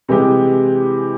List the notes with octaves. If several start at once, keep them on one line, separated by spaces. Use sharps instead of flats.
C3 E3 G3 G#3 G4